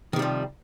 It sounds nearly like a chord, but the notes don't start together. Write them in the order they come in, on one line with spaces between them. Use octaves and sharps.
D#3 C3 G3 F3